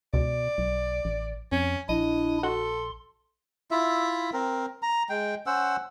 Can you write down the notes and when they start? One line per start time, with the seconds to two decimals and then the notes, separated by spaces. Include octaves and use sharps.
0.14 C#2 B2 D5
0.58 B1
1.05 A1
1.52 F2 C#4
1.89 A#1 D4 E4 D#5
2.43 F#4 A4 C6
3.71 E4 F4 E5
4.33 C4 A#4
4.82 A#5
5.09 G#3 G5
5.46 C#4 C5 F#5 E6